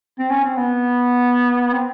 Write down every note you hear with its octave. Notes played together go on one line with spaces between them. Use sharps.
C4
C#4
C4
B3
C4